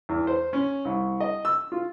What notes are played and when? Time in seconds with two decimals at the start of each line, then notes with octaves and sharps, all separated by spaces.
0.09 E2
0.27 C5
0.53 C#4
0.85 C2
1.20 D#5
1.45 E6
1.72 F4